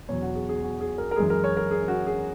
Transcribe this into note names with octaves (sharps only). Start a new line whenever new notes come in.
E2 B2 F#3 C#5
F#4
G#4
G#4
F#4
G#4
A#4
A#4
F#2 E3 G#3 G#4
A#4
C#5
A#4
G#4
F#4
G#4